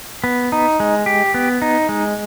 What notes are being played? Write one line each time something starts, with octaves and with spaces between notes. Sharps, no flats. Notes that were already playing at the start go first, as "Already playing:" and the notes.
B3
D#4
G#3
G4
B3
D#4
G#3